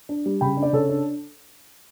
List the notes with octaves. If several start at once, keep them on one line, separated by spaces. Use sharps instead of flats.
D4
G3
C#3 G5 B5
D4
D5
C#3 A4 C#5
D4